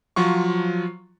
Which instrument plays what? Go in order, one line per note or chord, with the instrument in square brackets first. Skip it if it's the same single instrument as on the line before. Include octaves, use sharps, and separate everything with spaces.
[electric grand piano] F3 F#3 F4 C#6